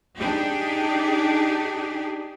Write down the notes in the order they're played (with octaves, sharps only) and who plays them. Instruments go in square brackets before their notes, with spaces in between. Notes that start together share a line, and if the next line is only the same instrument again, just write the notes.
[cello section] D4 D#4 G4 G#4